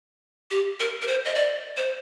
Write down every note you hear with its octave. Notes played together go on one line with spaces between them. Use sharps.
G4
A#4
A#4
C5
D#5
D5
C5